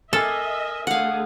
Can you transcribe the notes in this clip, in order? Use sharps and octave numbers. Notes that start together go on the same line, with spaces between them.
A4 A#4 D#5 E5 G#5
D3 A3 G#4 F5 F#5